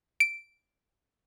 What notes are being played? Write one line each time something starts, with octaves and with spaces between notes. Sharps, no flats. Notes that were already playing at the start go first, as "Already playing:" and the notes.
D7